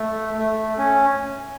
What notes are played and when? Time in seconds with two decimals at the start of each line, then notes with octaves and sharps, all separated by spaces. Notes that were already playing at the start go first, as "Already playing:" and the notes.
Already playing: A3
0.38 A3
0.78 C#4